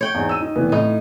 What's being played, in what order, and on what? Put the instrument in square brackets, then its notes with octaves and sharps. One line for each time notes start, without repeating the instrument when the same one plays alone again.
[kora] C#5 G5
[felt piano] E2 G#2
E6 D#7
D#4
F1 E3 B3
[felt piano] A2 [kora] D#4